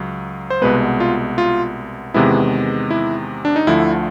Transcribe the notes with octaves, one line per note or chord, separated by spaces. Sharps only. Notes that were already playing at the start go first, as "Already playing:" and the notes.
Already playing: C#2 F#3
C5
C2 B2 G#3 B3 B4
F4
F4
E2 C3 D#3 G#3 B3 E4
E4
D4
D#4
D2 D3 F3 A3 E4